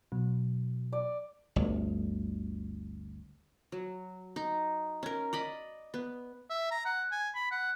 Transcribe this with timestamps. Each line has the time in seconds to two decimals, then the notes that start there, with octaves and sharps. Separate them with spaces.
0.12 B2 F#3
0.92 D5
1.56 G1 D2
3.72 F#3
4.36 D#4
5.03 C#4 A#4
5.33 D5 D#5 B5
5.94 B3
6.50 E5
6.71 A#5
6.85 F#5
7.12 G#5
7.35 B5
7.51 F#5